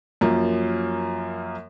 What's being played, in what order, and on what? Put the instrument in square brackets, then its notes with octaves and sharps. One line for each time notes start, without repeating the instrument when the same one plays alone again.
[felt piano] F#2 F3 A#3